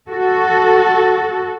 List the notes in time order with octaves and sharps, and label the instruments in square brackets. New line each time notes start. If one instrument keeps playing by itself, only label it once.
[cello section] F#4 A4